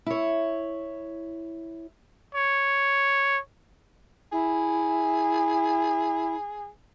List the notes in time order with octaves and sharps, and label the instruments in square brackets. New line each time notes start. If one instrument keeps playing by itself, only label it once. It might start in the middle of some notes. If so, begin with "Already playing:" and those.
[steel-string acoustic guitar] E4 C#5
[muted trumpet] C#5
[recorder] E4 [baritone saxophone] G#4